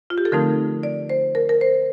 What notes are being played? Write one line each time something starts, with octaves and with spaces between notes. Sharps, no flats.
F4
G4
A4
D3 F3 A3 C4 D#4 A#4
D5
C5
A#4
A#4
C5